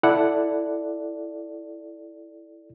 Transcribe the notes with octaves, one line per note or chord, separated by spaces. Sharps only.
E4 A4 D5 F#5